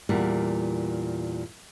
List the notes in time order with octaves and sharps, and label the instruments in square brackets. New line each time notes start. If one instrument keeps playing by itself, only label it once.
[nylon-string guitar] E2 A#2 G3